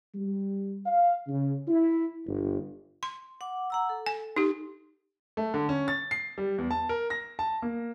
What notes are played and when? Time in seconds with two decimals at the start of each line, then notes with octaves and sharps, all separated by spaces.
0.14 G3
0.85 F5
1.27 C#3
1.68 E4
2.27 G1
3.03 C6
3.41 F#5 D6
3.70 F#5 A#5 E6
3.89 A4
4.06 G#5
4.36 D#4 G4
5.37 A3
5.54 D3
5.69 C#4
5.88 A6
6.11 C7
6.38 G3
6.58 E2
6.71 A5
6.89 A#4
7.10 A#6
7.39 A5
7.62 A#3